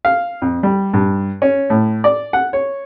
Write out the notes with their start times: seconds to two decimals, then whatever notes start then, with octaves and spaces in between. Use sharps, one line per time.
0.05 F5
0.42 F2
0.63 G3
0.93 G2
1.42 C#4
1.70 A2
2.04 D5
2.33 F#5
2.53 C#5